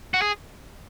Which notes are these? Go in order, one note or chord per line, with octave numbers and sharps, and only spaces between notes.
F#4
G#4